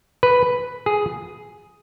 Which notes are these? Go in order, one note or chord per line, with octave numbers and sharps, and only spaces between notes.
B4
G#4